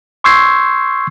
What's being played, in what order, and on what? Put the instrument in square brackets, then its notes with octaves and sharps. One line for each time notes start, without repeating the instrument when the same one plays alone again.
[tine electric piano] C6 C#6 E6 G6 G#6 C7